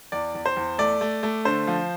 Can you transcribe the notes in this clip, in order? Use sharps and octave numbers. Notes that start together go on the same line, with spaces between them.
E2 D5
E2
C5
E2
A3 D5
A3
A3
D3 C5
F3